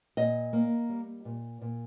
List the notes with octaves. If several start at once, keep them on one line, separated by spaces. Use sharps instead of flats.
A#2 D#5
A#3
G3
A#2
A#2